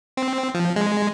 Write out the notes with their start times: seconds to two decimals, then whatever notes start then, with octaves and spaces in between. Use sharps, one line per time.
0.17 C4
0.54 F3
0.76 G#3